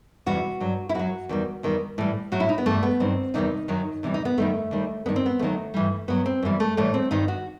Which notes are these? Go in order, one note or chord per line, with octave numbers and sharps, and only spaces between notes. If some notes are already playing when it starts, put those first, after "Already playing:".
E2 C3 E3 G3 F#4
G2 F#3
E4
F#2 F#3 F#4
E2 D#3 G3
E2 D#3 G3
A2 E3 G3
A2 F#3 F#4
E4
D#4
B3
G2 E3 G3 A3
B3
G2 D#3 F#3 C4
E2 C3 D#3 G3 D#4
F#2 D#3 F#3
E2 C3 E3 G3
D#4
B3
F#2 D#3 G3 A3
D#2 D#3 G3
G2 D#3 G3 B3
C4
B3
D#2 D#3 F#3 A3
G2 E3 G3
G2 F#3 B3
C4
F#2 E3 G3
A3
A2 E3 G3 A3
C4
G2 D#3 G3 D#4
F#4